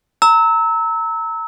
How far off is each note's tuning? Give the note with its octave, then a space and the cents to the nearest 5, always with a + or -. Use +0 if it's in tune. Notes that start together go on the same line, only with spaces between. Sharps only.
A#5 -25 E6 -25